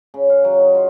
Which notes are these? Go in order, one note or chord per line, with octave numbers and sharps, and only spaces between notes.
C#3
F5
F#3
D#4
F4